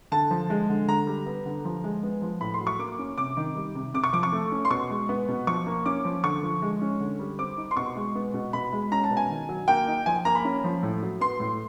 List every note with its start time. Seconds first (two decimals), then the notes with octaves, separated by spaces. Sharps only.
0.12 D3 A5
0.31 F3
0.50 G#3
0.69 D3
0.88 D3 A#5
1.07 G3
1.26 B3
1.46 D3
1.65 F3
1.84 G#3
2.03 B3
2.22 F3
2.41 A2 B5
2.54 C6
2.60 F#3
2.67 C#6
2.79 A#3 D6
2.99 C#4
3.18 C3 D6
3.37 D#3
3.55 G3
3.75 C3
3.94 C3 D6
4.04 C#6
4.13 F3 D6
4.23 C#6
4.32 A3
4.52 C#4
4.65 C6
4.70 B2 C#6
4.90 G#3
5.09 B3
5.28 B2
5.47 F3 C#6
5.66 A#3
5.85 C#4 D6
6.05 F3
6.23 D3 C#6
6.43 F3
6.62 G#3
6.81 C#4
7.00 D3
7.19 G3
7.39 C4 D6
7.57 D#4
7.71 C6
7.76 B2 C#6
7.96 G#3
8.15 B3
8.34 B2
8.53 B2 B5
8.72 G#3
8.92 C#4 A#5
9.04 A5
9.10 B2
9.17 G#5
9.29 D#3
9.49 F#3
9.68 A#3 G5
9.87 D#4
10.06 F3 G#5
10.25 A#3 A#5
10.35 B5
10.45 C#4
10.64 F3
10.83 A2
11.02 F#3
11.21 B3 C6
11.40 A2